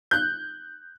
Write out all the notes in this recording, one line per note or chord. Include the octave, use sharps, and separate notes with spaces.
F#6 G6